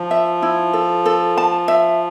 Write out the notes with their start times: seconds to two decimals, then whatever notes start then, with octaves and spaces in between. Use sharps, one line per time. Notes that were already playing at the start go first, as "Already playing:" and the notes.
Already playing: F3
0.11 E5
0.42 E4
0.73 A4
1.06 A4
1.37 A5
1.68 E5